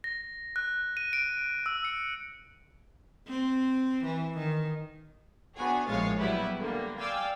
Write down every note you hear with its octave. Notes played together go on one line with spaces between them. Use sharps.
A#6
F#6
D#7
D7
E6
C#7
C4
E3
D#3
B3 D4 F#4 G#4 C#5 G#5
A#1 A2 G#3 C#5 F5 A6
F#3 G3 B3 E4 B4
D3 G3 A#3
D5 F5 G5 G#5 D6 E6